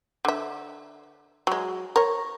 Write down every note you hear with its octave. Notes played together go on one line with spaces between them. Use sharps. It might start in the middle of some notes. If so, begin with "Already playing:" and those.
D3 E5
F#3 G#3
A#4 C#5